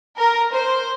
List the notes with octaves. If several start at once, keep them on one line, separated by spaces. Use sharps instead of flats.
A#4
C5